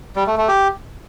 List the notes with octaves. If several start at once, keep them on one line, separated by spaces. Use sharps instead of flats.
G3
A3
A3
G4